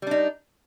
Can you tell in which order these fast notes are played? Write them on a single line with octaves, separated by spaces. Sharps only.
G3 D4 D#4